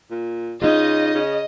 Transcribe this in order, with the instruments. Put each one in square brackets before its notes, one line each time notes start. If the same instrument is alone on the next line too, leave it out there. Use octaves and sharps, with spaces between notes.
[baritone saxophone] A#2
[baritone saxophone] C#3 [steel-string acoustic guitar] D#4 F4 [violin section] D#5
[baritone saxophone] C#3